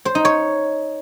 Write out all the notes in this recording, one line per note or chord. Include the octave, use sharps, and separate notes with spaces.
C5
D#4
C#5